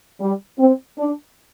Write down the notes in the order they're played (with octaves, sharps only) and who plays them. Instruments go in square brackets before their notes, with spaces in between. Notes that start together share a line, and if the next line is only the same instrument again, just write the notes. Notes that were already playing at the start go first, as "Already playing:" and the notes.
[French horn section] G3
C4
D4